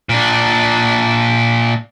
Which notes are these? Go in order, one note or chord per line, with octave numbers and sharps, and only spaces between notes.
A#2 D4